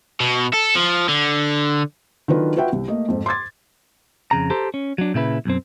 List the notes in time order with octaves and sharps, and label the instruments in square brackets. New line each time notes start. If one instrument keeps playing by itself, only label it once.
[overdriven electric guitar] B2
A4
F3
D3
[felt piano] D#3 F#3 D4 F4 A4 B4
F4 F#4 B4 E5 F#5 G5
C2
A3 A#3 D#5
F2 G#2
C6 D6 G#6 A6
[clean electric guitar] F2 C#3 A#5
G4 A4 C5 A#5
C#4
F#3 D4
A#2 C#3 E4 B4
B1 F#2 C4